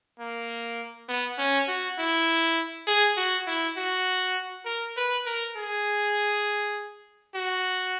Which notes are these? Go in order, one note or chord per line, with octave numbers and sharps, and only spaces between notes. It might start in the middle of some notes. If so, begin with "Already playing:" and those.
A#3
B3
C#4
F#4
E4
G#4
F#4
E4
F#4
A#4
B4
A#4
G#4
F#4